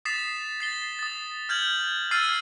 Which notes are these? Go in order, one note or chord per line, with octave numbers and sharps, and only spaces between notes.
D#6 A6 B6 C7 E7
A6 C7 G7
D#6 A6
F6 G6 G#6 F#7
E6 F6 G#6 A6 C7 D#7